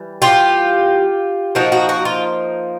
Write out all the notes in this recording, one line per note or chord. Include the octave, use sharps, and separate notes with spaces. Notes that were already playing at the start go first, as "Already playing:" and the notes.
Already playing: E3 G3
F4 G4
F3 A#3 D#4 F#4
F#4
F#4
F4